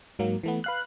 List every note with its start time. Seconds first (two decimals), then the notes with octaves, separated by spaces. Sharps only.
0.19 G#2 F#3 A#3
0.43 E3 A3 B3
0.64 B4 F5 F#6